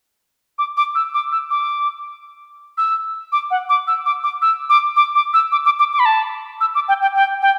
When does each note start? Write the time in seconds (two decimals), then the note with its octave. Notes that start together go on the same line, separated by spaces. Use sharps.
0.58 D6
0.77 D6
0.95 E6
1.14 D6
1.32 E6
1.50 D6
2.78 E6
3.32 D6
3.51 F#5
3.69 D6
3.87 E6
4.06 D6
4.23 D6
4.42 E6
4.69 D6
4.96 D6
5.15 D6
5.34 E6
5.52 D6
5.65 D6
5.79 D6
5.93 D6
5.99 B5
6.05 A5
6.61 E6
6.75 D6
6.88 G5
7.02 G5
7.15 G5
7.42 G5